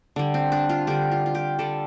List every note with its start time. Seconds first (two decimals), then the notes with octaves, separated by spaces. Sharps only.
0.16 D3 G3
0.34 C4
0.52 D4
0.69 F4
0.87 D3 G3 G4
1.12 F4
1.26 F4
1.35 G4
1.59 D3 G3 A4